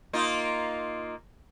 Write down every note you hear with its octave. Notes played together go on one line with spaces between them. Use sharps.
A#3 D#4 F4